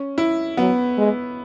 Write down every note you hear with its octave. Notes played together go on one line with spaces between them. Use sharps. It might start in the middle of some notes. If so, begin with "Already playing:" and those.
Already playing: C#4
E4
F#3 B3
G#3